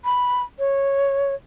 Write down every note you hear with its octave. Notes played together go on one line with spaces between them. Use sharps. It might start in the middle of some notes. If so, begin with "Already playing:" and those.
B5
C#5